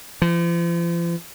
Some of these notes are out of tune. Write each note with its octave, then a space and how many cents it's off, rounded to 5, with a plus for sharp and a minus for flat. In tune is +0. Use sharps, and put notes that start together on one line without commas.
F3 -40